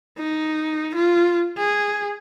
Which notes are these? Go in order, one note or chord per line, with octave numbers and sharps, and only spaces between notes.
D#4
F4
G#4